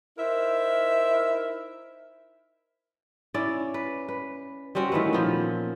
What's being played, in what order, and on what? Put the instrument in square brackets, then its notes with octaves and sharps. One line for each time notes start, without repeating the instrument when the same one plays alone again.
[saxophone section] D#4 E4 A#4 C5 E5
[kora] C#4 E4 D5
B4
B4
G3 C4 C#4 F#4
D#3 E3 A3 B4
A#2 F3 B3